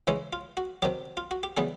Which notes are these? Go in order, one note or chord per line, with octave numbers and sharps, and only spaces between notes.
C#3 E3 G#3 C#4 E4
F4
F#4
C3 D#3 F#3 G4
F4
F#4
G4
C#3 E3 G3 B3 G#4